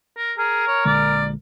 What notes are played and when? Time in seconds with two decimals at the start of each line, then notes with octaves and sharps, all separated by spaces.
0.17 A#4
0.38 G#4 A#4
0.67 C#5
0.85 A#1 D3 G#3 D5